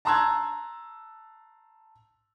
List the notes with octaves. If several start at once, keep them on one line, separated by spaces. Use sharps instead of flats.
A5 A#5 C6 E6 F#6 G#6